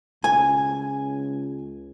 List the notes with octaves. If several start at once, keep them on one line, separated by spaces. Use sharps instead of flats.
C#2 G#5